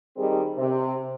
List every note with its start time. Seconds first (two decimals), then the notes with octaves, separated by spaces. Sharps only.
0.16 D#3 G3 C4 G#4
0.57 C3